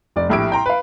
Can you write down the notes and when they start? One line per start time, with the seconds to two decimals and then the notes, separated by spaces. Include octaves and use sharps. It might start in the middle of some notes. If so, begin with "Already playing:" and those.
0.16 F1 D5
0.29 A#1 A2 E4 G4 D7
0.52 G5 A#5 C6
0.66 B4 F5